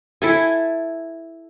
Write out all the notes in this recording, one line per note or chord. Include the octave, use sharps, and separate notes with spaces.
E4 A4 G#5